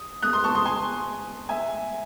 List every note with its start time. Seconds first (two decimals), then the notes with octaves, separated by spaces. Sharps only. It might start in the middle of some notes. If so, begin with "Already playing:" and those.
Already playing: D#6
0.22 D#6 F#6
0.33 C6 D#6
0.44 A5 C#6
0.55 C6 D#6
0.65 G#5 C6
1.49 E5 G#5